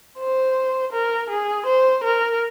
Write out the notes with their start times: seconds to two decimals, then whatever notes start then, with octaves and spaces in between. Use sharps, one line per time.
0.19 C5
0.92 A#4
1.30 G#4
1.66 C5
2.03 A#4